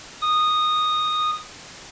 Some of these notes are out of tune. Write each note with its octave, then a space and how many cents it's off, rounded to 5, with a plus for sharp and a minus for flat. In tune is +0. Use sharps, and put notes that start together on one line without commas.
D#6 -10